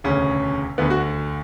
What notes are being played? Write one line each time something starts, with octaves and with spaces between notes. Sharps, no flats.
E1 D2 C#3 C#4
D2 D3 B3
F#4